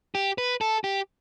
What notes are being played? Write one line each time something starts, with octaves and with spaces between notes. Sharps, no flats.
G4
B4
A4
G4